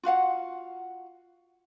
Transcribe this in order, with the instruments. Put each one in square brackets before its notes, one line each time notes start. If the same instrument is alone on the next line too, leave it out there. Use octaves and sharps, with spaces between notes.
[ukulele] F4 F#4 F5 F#5